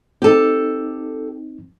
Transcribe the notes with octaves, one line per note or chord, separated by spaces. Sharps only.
C4 D#4 G4 A4